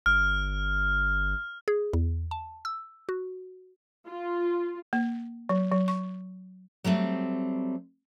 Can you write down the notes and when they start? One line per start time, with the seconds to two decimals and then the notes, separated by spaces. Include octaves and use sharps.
0.06 G1 F6
1.68 G#4
1.93 E2
2.31 A5
2.65 E6
3.09 F#4
4.07 F4
4.93 A#3
5.49 F#3
5.72 F#3
5.88 C#6
6.84 F#3 G3 A3 C4